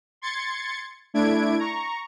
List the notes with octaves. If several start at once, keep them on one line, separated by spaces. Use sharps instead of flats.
C6 G#6 A6 C#7
A3 D4 E4 G#6 D7
A#5 C#6